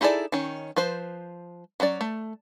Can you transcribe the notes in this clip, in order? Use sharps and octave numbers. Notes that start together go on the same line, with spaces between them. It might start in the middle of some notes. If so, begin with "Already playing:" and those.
D#4 E4 G#4 A4 D5
D#3 C#4
F3 B4 C5
F#3 C#4 G#4 D5
A3